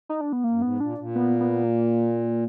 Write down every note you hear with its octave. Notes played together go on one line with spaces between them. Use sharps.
D#4
D4
B3
A#3
F#2
G#2 B3
A#2 D4
A#2
B3
B3
A#3